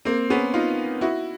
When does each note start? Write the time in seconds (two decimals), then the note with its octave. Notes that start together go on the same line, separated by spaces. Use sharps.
0.05 A#3 C4
0.30 B3 C#4
0.54 D#4 F4
1.01 E4 F#4